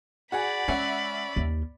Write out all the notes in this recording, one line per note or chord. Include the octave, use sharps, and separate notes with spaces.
F#4 G#4 D5 F#5 B5
G#3 C#4 E5 F#5
D#2